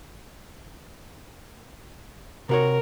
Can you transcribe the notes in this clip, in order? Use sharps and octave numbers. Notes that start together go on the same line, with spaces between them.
C3 F#4 A#4 C#5